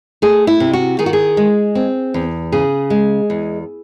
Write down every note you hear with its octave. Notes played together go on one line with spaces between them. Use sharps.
A3 G#4
E4
C3
F#4
D#3 G#4
F#4
G#4
G#3
C4
E2
C#3 G#4
G#3
E2